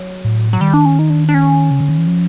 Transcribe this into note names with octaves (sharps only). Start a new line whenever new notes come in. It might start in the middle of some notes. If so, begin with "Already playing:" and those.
Already playing: F#3
A2
F#3
D#3 G3
D4
C#4
D#4
D4
D4
C#4
C#3
D3
D#3
E3
F3